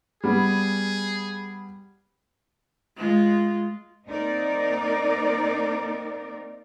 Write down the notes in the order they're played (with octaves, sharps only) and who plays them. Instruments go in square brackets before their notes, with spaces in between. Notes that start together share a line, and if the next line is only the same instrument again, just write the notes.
[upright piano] G3 B3 [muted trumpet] G#4
[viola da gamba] G#3 F4
[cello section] A#3 C4 D#4 A#4 D5